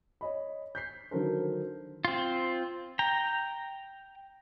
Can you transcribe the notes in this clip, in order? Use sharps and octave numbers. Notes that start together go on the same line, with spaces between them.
C#5 D#5 B5
G6 B6 C7
D3 D#3 F#3 A4 A#4 C5
C4 F4
G5 A#5